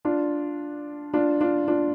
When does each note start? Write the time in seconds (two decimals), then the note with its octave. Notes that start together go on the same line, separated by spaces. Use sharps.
0.05 D4 F4
1.13 D4 F4
1.41 D4 F4
1.68 D4 F4